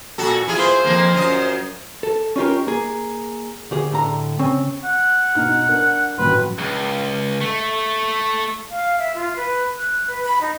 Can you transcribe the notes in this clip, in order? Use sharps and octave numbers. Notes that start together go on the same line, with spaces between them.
A#2 F#4 A4
E4 F4 G#4
C5
F2 F3 A#3
F#2 F4 D#5
A4
C#4 D#4 F4 G4 A#4
A#3 G#4
D2 G4 G#4
A2 D3 A#5
C#3 C4 C#4
F#5
B2 D#4 F6
D4 A#4
A1 F#3 B4 C6
C#2
A3
F5
E5
F4
B4
F#6
B4
B5
D#4